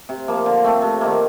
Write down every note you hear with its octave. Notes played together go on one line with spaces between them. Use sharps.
C3
F3 A#3
D3
A3 C4
C3
D#3 A#3